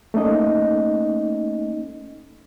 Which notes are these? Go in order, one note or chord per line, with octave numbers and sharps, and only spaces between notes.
A3 A#3 C#4 D#4 D#5